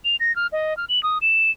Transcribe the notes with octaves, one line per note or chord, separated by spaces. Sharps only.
F7
A#6
F6
D#5
F6
F#7
D#6
E7